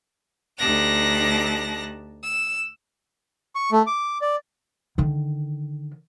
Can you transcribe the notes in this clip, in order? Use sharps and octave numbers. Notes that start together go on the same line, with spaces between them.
D2 D#4 G4 A5 F#6 A#6
E6
C#6
A3
D6
D5
D3 D#3